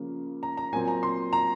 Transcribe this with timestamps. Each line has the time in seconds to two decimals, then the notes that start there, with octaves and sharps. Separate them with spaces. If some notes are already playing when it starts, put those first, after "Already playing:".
Already playing: C#3 F3 A#3
0.43 A#5
0.57 A#5
0.72 A#2 F#3 C4 G#5
0.88 A#5
1.03 C6
1.33 A#5